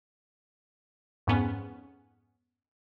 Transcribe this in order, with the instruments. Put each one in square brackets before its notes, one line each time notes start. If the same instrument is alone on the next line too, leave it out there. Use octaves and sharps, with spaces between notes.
[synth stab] F2 G#2 B3 C#4